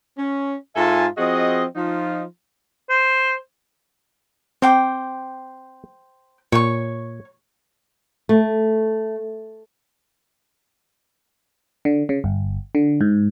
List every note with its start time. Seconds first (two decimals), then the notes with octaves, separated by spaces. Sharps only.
0.18 C#4
0.76 G#2 F4 A4 E5 G#5 A5
1.18 F3 C4 F#4 G#4 D#5
1.76 F3 D#4 F4
2.89 C5
4.62 C4 C5 G5 D6
6.52 A#2 C#5 C#6
8.29 A3
11.85 D3
12.09 C#3
12.24 G1
12.75 D3
13.01 G#2